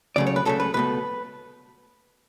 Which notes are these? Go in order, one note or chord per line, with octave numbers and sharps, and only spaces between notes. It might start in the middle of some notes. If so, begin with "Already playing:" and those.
C#2 C#3 F#3 A3 D5
C#5
B4
C#2 C#3 F#3 A3 A4
B4
C#2 B2 A3 B4